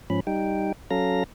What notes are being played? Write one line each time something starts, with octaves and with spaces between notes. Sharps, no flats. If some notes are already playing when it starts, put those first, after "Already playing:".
G#2 F3 C#4 B5
G3 D#4 G5
F#3 C#4 A4 F5 A#5 A#6